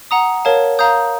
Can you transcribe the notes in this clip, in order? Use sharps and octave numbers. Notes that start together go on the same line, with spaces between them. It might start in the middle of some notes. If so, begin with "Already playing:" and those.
F#5 A#5 D#6
A#4 C#5 F5 A5
F5 A#5 D#6 G6